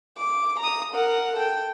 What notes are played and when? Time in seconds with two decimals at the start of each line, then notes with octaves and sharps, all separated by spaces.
0.17 D6
0.60 A#5 D#6
0.93 A#4 F#5
1.36 A4 G5